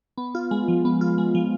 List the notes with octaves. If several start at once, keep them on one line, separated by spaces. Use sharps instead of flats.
B3
F4
G#3
F3
B3
F4
G#3
F3